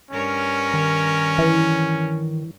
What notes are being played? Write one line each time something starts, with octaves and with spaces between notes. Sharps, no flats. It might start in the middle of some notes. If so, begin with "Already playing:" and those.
G2 C#4 A#4 C#5
D#3
E3